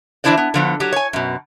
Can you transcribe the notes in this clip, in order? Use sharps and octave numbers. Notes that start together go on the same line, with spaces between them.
E3 G3 D4 E4 C5 D5
B3
D3 F3 B3
F#3 G4
C#5 G#5
F#2 B2